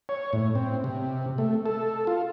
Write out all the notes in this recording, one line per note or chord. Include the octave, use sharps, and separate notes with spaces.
C#5
A2
C4
C3
A3
A4
F4